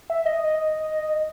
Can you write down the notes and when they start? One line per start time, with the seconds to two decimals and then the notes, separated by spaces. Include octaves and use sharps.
0.10 E5
0.26 D#5